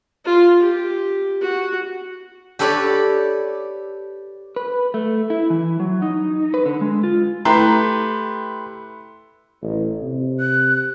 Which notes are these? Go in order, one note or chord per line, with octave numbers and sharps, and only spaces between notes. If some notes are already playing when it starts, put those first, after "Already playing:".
F4
G4
F#4
G4 A4 B4 C#5 D5
B4
A3
E4
E3
F#3
D#4
B4
D3
G#3
F4
A3 E4 G4 B4 A#5 C6
A1
C3
F#6